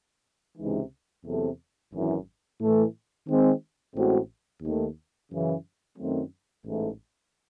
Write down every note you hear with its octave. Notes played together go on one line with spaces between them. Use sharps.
C#2 C3 E3 G#3 D#4
E2 C3 F#3 A3 C4
G#1 F#2 E3
A2 E3 A3
D#3 G#3 C4
A1 A2 G#3 C4 F#4
D#2 D#3 A3
F#2 C#3 E3
F#2 D#3 F#3 A3 C4
A1 G#2 E3 A3